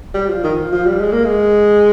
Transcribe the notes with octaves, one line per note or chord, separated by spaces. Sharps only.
G3
F3
D#3
F3
F3
G3
G#3
A#3
G#3